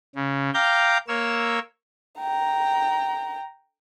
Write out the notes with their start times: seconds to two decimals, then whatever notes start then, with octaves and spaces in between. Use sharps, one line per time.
0.15 C#3
0.54 F5 G5 A#5 D6 G6
1.08 A#3 A#4 C#5 E6
2.20 G5 A#5